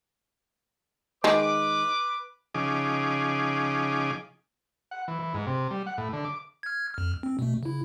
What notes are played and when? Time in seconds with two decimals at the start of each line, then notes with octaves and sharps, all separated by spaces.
1.24 D#3 G#3 B4 D6
2.55 C#3 F3 D#4 G#4 D6
4.91 F#5
5.08 E3
5.20 E3
5.34 G#2
5.47 C3
5.70 G3
5.87 F#5
5.98 A2
6.13 D3
6.25 D6
6.63 F6 G#6
6.94 F2 F6
7.23 C4
7.39 B2 A3
7.63 C#3 E4